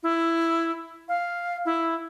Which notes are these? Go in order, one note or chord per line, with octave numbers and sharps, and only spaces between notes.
E4
F5
E4